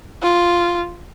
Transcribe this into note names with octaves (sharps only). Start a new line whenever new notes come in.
F4